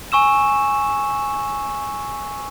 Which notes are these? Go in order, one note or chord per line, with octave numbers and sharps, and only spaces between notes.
G#5 C#6 E6 E7